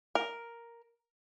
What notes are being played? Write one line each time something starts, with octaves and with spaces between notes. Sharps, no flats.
A#4